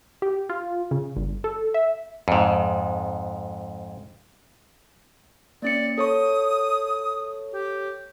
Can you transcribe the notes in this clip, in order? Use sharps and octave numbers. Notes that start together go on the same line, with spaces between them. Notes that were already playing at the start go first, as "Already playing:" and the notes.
G4
F4
C#3
G1
A4
E5
F2 G#2
A#3 C#4 D5 C#7
A4 C#5 C#6 D#6
G4